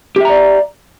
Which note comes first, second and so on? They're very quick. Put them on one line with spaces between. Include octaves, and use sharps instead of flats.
G4 E5 A#5 D5